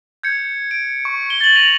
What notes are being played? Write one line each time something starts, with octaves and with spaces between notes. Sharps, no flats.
G6 G#6 C#7
D7
C#6
D7 G7
A6 F#7
A#6 D#7 F7 F#7